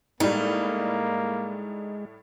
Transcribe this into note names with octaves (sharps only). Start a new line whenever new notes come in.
A2 G3 G#3 A#3 D#4